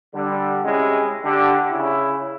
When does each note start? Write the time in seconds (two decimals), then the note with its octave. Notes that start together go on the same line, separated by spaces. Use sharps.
0.14 D3 G3
0.64 C3 G#3 C#4 E4
1.24 D3 G4
1.71 C#3 E4